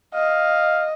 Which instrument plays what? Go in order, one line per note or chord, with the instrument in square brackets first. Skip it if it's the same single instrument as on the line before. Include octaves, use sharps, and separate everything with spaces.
[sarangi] D#5 [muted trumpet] F5